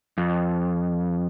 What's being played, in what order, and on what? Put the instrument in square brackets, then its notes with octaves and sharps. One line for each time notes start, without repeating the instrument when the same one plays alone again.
[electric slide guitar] F2